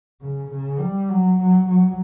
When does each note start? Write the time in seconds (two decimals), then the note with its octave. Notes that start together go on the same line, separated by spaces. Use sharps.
0.21 C#3
0.51 C#3
0.80 G3
1.09 F#3
1.39 F#3
1.69 F#3